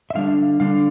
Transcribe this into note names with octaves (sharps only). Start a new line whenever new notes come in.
E5
D3 G3 D4 F5
D3 G3 D4 F5